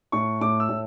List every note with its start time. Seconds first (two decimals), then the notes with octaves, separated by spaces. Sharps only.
0.12 A2 C#6
0.41 A2 D6
0.60 E6
0.69 A2